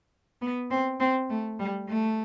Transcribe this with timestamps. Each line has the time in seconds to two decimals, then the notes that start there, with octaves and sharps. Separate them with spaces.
0.41 B3
0.70 C4
1.00 C4
1.30 A3
1.59 G3
1.88 A3